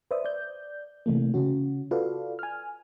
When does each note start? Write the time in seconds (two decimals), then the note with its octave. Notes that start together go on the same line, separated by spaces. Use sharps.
0.11 B4 C5 D5 E5 D#6
0.25 D5 G6
1.06 C3 E3 A3 A#3
1.34 C#3 C#4 F#4
1.91 F4 F#4 A4 B4 D5 F5
2.39 G#5 F6